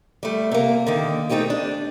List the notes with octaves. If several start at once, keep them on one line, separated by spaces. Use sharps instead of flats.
G3 A3
C3 A#3
D3 D#3 A#3
A3 C4 D#4 G4 G#4
D4